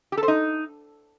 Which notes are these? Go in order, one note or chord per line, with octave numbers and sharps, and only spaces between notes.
G4
A4
C5
D#4